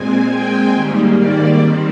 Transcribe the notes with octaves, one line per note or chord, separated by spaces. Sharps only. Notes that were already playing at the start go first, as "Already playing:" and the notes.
Already playing: A#2 G#3 C4 G#5
G5
G#2 D#3 G3 A#3
D5
D#3 G3 C4